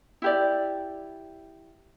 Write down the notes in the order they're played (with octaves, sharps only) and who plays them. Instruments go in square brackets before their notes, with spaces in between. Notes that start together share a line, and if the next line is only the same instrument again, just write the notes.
[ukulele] E4 G4 D5